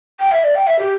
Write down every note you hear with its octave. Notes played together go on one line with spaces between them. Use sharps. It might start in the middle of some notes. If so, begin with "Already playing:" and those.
G5
E5
D5
G5
E5
G4